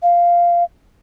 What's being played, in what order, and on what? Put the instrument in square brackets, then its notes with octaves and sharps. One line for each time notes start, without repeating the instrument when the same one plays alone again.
[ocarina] F5